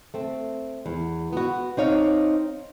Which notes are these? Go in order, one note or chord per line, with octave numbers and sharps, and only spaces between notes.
A3 C4
E2
B3 F#4
C4 D#4 C#5 F5